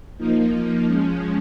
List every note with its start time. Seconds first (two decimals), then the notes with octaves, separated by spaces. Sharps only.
0.17 F3 A#3 D#4
0.86 F3 G#3 C#4